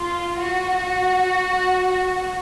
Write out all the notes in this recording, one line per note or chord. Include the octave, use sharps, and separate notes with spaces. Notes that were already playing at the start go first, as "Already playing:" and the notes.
Already playing: F4
F#4